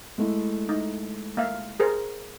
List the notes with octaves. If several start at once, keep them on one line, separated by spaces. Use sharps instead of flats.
G#3 A3 E4
D#4
A#3 E5 F5
G#4 A#4 C5